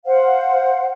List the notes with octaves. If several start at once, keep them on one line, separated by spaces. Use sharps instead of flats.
C5 F5 F#5